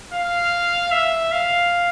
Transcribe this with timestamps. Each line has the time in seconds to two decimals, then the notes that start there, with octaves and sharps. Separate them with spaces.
0.13 F5
0.91 E5
1.31 F5